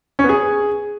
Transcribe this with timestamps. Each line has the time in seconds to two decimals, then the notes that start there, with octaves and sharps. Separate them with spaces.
0.19 C#4
0.24 B3
0.29 G#4